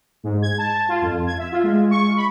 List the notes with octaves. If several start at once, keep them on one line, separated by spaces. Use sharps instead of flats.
G#2
G#6
A5
F4
F2
G#6
E5
F4
G#3
C#6
B5